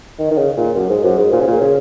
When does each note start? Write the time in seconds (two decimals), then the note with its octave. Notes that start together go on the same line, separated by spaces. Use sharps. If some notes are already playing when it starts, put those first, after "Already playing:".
0.19 D#3
0.31 D#3
0.38 C#3
0.57 A#2
0.76 F#2
0.90 G#2
1.04 F#2
1.18 G#2
1.33 A#2
1.41 C#3
1.47 A#2
1.61 C#3